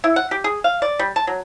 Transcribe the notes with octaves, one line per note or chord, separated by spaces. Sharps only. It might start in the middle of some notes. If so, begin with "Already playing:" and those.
E4
F#5
G4
G#4
F5
D5
G3
A5
F#3